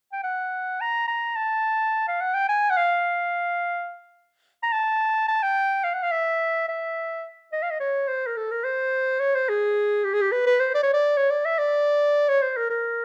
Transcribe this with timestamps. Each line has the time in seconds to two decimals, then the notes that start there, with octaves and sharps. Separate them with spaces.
0.13 G5
0.24 F#5
0.81 A#5
1.08 A#5
1.36 A5
2.08 F5
2.21 F#5
2.34 G5
2.49 G#5
2.70 F#5
2.77 F5
4.63 A#5
4.72 A5
5.28 A5
5.43 G5
5.84 F5
5.94 F#5
6.03 F5
6.12 E5
6.68 E5
7.53 D#5
7.62 F5
7.71 D#5
7.80 C#5
8.08 C5
8.27 A#4
8.37 A4
8.51 A#4
8.65 C5
9.20 C#5
9.35 C5
9.49 G#4
10.04 G4
10.14 G#4
10.22 G4
10.32 B4
10.47 B4
10.60 C5
10.75 D5
10.83 C#5
10.93 D5
11.17 C#5
11.30 D5
11.45 E5
11.58 D5
12.29 C#5
12.42 C5
12.57 A#4
12.70 A#4